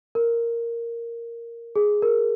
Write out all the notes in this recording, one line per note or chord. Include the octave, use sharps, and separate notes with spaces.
A#4
G#4
A#4